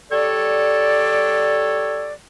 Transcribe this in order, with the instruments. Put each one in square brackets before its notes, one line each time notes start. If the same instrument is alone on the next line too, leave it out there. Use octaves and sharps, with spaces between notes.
[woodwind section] G3 A4 C#5 D5